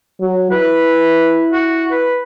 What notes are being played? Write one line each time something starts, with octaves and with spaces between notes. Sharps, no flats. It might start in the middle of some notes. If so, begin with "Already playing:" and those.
F#3
E4 B4
F#4
B4